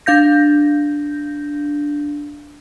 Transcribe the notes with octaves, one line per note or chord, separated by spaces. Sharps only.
D4 F5 G6 A#6